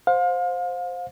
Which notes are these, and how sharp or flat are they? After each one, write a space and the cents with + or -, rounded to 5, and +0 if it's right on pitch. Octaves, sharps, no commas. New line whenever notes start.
C5 +0 F5 +35